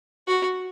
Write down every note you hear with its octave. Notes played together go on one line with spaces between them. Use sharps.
F#4